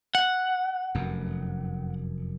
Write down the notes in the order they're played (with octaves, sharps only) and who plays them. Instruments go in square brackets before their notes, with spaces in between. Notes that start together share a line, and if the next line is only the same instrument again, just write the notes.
[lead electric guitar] F#5
[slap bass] F1 F#2